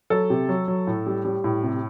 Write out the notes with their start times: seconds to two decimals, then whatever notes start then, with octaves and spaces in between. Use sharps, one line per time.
0.10 F#3 A4
0.30 C3
0.49 F#3
0.68 F#3
0.87 A2
1.06 G3
1.25 G3
1.44 A2
1.63 C3